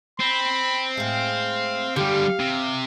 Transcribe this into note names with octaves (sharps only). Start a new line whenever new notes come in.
C4 B5
A2 G#3 F5
D3 G3 G4 F5
C3